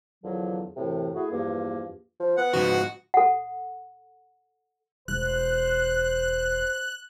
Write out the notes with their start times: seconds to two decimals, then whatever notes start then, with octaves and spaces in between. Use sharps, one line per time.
0.24 E2 D3 F3 F#3
0.76 F#2 A2 C3 E3
1.15 A3 E4 F#4 G#4
1.31 E2 G2 F3 A#3
2.20 F3
2.38 B3 F#5
2.54 G#2 C#3 F3 F#4
3.14 A4 F#5
5.08 E1 C5 F#6